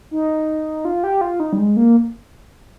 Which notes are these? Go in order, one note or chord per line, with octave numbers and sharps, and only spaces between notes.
D#4
F4
G4
F4
D#4
G3
G#3
A#3